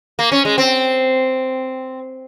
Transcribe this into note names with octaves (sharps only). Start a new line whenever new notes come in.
A#3
C#4
G#3
C4